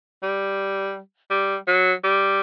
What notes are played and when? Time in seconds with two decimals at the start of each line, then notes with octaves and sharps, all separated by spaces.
0.23 G3
1.31 G3
1.68 F#3
2.04 G3